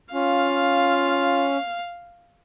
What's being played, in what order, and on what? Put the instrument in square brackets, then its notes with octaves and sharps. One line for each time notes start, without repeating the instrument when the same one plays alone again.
[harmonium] C#4 [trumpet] F4 [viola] F5